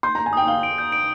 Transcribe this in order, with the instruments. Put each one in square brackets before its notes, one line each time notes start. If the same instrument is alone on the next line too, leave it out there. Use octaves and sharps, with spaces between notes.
[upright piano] C6 [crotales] G6
[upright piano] A#5
[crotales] G6
[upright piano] G#5
[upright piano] G5 [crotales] D#6
[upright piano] F5 [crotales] G7
[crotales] D7
G6
D7